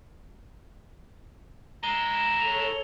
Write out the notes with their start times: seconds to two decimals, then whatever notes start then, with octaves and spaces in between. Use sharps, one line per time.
1.84 G#3 E4 A#5 G7
2.41 A4 C#5 F7